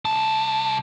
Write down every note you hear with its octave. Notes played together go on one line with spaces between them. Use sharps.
C2 A5